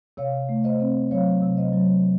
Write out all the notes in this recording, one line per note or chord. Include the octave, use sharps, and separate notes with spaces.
C3 C#5 F5
A3
C5 D#5
C4
F#3 C#5 F5
C3
C5 D#5
F#3